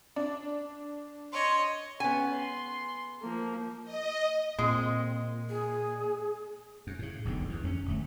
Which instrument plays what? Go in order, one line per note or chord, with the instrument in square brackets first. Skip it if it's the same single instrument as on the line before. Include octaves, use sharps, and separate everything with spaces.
[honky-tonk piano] D4
[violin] C#5 D#5 [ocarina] C6
[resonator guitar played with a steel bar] B3 G#5 [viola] C#4
[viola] C6
F3 A#3
[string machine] D#5
[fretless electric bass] A#2 [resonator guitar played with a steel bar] G#3 [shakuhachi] C4
[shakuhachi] G#4
[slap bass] F#2
A2 C#3
E1 B1 A#2 D3
E2 G2
F2 C4 C#4
D1 A3